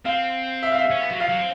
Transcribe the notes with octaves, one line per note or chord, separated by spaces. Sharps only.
C4 F5
E5
F5
E5
C#4
B3
F#3
F3 F5
F#3
C4